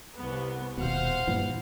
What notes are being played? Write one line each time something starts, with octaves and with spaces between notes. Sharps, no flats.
C2 B3
D#1 B2 C5 F5 F#5
G2 A#2 E3